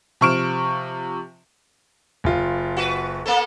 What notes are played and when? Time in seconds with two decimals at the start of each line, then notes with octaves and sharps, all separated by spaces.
0.21 C3 F3 C#6 F6 D7 E7
2.24 F#1 F4
2.77 F#4 B4
3.26 A#3 B3 A4